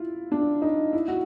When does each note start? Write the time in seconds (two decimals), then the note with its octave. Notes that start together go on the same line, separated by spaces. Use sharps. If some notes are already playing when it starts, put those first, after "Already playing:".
Already playing: E4 F4
0.32 D4
0.62 D#4
0.93 E4
1.08 F#4